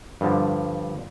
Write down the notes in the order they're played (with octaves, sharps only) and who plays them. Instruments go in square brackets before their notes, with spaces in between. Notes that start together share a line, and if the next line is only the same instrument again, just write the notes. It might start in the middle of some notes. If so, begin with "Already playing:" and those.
[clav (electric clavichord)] G2 D3 F3